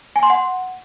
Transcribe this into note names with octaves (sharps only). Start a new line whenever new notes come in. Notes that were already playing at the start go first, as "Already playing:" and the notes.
G#5
C6
F#5